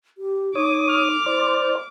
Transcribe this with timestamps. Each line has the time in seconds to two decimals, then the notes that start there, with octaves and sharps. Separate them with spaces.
0.18 G4
0.55 D#4 C#5 D6 D#6
0.89 F6
1.26 E4 C5 D5